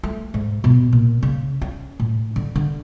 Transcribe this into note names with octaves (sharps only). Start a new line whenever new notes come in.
A3
G#2
B2
A#2
C#3
C#4
A2
D3
D3